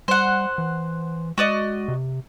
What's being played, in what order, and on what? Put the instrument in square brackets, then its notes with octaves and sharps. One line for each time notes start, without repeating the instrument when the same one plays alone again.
[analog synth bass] G3 [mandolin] C5 F#5
[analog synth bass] E3
[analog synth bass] G#3 [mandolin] F#4 D5 D#5
[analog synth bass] C3